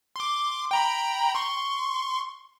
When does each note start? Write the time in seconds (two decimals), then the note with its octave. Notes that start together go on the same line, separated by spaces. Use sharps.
0.16 C6 D6
0.71 G5 A#5 B5
1.35 C6 C#6